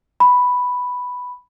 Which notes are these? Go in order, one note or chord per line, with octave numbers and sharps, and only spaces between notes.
B5